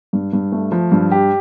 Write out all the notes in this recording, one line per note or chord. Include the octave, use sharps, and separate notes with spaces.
G2
G2
A3
F3
G2
G4